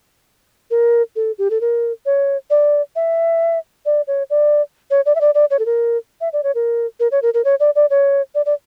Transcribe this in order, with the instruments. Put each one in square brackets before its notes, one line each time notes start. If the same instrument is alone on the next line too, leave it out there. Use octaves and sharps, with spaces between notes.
[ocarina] A#4
A4
G4
A4
A#4
C#5
D5
E5
D5
C#5
D5
C#5
D5
E5
D5
D5
C#5
A4
A#4
E5
D5
C#5
A#4
A#4
C#5
A#4
A#4
C#5
D5
D5
C#5
D5
D5